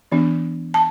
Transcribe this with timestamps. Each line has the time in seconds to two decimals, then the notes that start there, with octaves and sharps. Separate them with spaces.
0.12 E3 B3 D4
0.74 A5